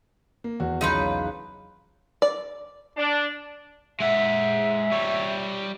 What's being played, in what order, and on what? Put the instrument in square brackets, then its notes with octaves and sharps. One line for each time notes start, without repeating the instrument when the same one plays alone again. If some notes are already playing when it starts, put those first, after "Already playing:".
[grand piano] A#3
E2 F#4
[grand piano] B1 E2 C#3 [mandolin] D#4 F4 B4
[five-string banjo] D5
[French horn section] D4
[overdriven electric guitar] G#3 F#5 [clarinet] E5
[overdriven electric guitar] G3 C#5